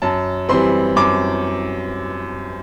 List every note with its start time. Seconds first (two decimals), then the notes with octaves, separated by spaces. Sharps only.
0.02 F#2 A5
0.49 E3 G3 C4 C6
0.96 F#2 D6